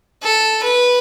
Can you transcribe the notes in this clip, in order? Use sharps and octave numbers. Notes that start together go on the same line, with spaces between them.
A4
B4